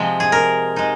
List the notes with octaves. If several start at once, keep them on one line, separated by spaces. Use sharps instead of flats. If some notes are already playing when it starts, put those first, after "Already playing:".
Already playing: C3 F3 G#3 C4
G#4
A#4
G#3 D#4